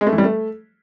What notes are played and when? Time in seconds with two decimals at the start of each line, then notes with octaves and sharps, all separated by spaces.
0.01 G#3
0.07 A3
0.12 E3
0.18 G3
0.24 A3